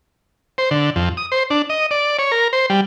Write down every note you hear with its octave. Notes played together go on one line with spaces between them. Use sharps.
C5
D3
F2
D#6
C5
D4
D#5
D5
C#5
A#4
C5
G3